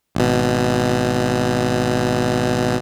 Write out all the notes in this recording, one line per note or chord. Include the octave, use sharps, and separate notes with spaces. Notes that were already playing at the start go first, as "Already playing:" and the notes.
G#1 B2